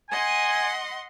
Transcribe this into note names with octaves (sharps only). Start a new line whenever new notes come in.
D#5 F#5 G#5 C6